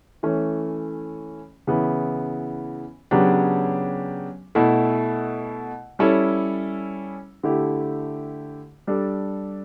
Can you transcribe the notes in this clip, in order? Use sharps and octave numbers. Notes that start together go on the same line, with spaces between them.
E3 A3 C#4
C#3 E3 B3 E4
C#3 F#3 B3 D4 G4
B2 A3 E4
G3 C#4 E4 A4
D3 A3 E4 G4
G3 D4 A4